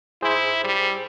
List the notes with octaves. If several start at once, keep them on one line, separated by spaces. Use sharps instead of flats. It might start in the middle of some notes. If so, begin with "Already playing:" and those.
E4 G#4 C5
G3